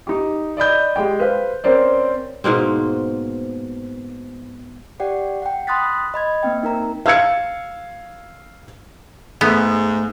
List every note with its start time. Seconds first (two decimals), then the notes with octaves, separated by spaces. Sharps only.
0.07 D#4 G4
0.57 D5 D#5 B5 G6
0.96 G#3 G4 G5
1.19 B4 C5 F5
1.64 C4 C#4 A#4 C5 D5
2.44 G#2 B2 A#3 C4
5.00 G4 D5 F#5 G5
5.42 F#5 G5
5.67 B5 C6 D#6 F#6 A6 B6
6.14 D#5 B5 G#6
6.43 A#3 C4 G5
6.63 D#4 A#4 A#5
7.06 F5 E6 G#6 C#7
9.41 G#2 A3 B3 G#4